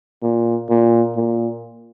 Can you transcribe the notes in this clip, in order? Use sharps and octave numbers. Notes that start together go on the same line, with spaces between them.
A#2
A#2
A#2